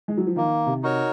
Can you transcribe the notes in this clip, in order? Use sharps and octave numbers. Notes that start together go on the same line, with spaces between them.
G#3
F#3
F3
D#3 A#3
C3
D#4 F#4 A#4 C#5